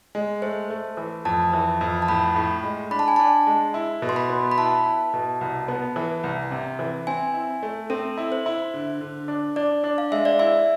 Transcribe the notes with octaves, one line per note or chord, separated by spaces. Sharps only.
G#3
A3 C5
A3
E3
F2 A5
E3
F2
A5
A2 B5
A2
G#3
D4 B5
A5
G#5
D4 A5
G#3
E4
B2
C6
B5
B3
B5
E4 A5
E4
B2
C2
B3
E3
C2
C3
E3
C4 G#5
E4
A3
C4 A4
E4
C5
E4
D3
D3
D4
D4 D5
D4
F5
G#3 E5
D5
E4 E5